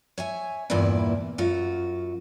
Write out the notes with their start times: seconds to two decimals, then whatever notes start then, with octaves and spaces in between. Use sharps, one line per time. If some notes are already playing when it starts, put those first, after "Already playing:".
0.18 C#5 E5 G#5
0.70 E2 G2 A#2 A#3 E4 D5
1.38 F#2 F4 F#4